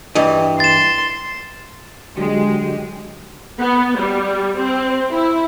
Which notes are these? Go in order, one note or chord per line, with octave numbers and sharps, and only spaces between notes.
G2 E3 D#5
C6 A6 E7
D3 F#3 G#3 G4
B3
G3
C4
E4